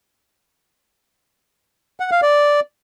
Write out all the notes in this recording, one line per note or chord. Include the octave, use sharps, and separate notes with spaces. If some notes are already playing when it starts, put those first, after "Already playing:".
F#5
F5
D5